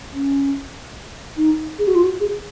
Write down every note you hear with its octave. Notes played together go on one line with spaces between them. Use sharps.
C#4
D#4
G#4
F#4
F4
F#4
G#4